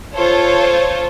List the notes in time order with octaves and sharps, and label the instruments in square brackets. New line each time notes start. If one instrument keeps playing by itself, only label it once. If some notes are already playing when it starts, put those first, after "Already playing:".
[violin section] F4 A4 C5 C#5